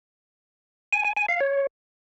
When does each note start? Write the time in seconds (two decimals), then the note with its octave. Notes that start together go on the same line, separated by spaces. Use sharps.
0.93 G#5
1.05 G#5
1.17 G#5
1.29 F5
1.41 C#5